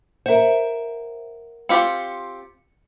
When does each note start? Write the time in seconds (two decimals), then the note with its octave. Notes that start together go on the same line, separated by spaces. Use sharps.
0.26 A#4 C5 E5 F#5
1.69 C4 F4 G4 C#7